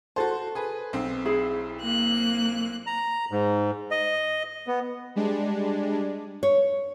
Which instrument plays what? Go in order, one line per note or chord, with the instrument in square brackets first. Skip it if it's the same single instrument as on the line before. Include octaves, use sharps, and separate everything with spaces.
[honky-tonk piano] F#4 C5 [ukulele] A4 A5
[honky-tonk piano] G#4 B4
B1 C4
[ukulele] E4 G#4 B5
[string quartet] A#3 F#6
[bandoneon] A#5
G#2
D#5
B3
[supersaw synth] G3 G#3 D4
[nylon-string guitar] C#5